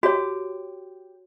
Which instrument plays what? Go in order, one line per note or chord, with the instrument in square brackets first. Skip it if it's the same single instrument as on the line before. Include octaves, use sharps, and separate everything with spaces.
[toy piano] F#4 C#5 [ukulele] G4